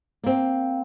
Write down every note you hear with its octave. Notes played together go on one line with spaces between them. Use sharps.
A#3 C4